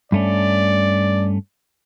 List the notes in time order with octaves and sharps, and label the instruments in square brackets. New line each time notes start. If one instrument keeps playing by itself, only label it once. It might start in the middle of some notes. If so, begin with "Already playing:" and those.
[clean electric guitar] G2 A3 C#4 [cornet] D5